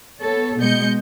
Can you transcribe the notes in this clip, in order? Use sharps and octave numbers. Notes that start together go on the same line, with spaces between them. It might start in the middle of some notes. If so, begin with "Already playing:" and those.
B3 A4 C#5
B2 G#3 D#5 G6 C#7